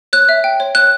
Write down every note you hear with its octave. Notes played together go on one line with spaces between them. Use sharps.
C#5 F#6
E5
G5
C#5
C#5 F#6